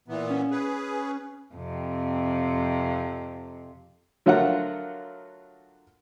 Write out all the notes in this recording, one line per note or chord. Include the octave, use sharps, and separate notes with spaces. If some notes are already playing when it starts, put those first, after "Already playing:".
A#2 E3 B3
C#4
G#4 B4
F2 C3
D3 F#3 A3 F4 A#4 F#5